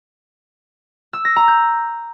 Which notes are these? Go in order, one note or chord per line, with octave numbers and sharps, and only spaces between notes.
E6
A#6
A#5
G6